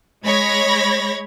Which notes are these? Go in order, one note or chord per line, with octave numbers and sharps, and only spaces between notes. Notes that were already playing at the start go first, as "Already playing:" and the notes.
G#3 C#5 B5 G#6 A#6